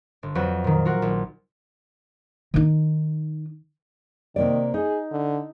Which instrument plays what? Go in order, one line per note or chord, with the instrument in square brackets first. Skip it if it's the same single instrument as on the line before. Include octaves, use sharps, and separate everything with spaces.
[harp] G1
F2 F#3 B4 F#5 G6
A#2 D#3
F4 F#4 A#4 F#5
A#1
[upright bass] D#3 D#4
[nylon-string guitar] C3 A#3 D5 [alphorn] D#3
[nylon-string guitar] D#4 [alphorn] G#4
[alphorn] D3